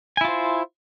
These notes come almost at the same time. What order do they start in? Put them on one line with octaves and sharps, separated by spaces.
G#5 E4 F4 C5